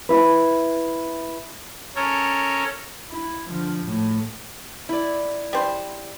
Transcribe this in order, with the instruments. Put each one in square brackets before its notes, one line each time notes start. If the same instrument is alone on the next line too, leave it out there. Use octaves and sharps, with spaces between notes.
[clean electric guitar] E4 B4
[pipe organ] C#4 A4 A#4 C#5
[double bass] E4
D3 F3
A2
[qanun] E4 D5
[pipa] G3 C5